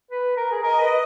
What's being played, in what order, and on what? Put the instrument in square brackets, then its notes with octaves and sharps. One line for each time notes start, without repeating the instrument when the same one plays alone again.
[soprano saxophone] B4
A#4
G#4
[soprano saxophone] A#4 [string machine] D#5
[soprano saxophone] B4